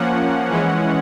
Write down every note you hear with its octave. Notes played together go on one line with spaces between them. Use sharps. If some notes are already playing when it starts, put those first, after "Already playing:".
Already playing: F3 A#3 C#4 F#5
E3 G#3 C#4